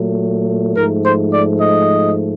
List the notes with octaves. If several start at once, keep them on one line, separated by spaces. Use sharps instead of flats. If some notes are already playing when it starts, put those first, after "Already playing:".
Already playing: A#2 F#3 A3
G#2 F3 A3 A#4
C5
D5
D#5